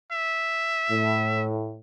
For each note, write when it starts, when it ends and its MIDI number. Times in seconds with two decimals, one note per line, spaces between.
0.12 1.45 76
0.90 1.77 45